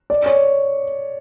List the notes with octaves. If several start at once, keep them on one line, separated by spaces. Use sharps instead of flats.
D5
C#5